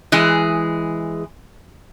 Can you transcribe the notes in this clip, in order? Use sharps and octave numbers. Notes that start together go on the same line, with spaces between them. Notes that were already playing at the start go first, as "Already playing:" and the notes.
E3 G#3 G#4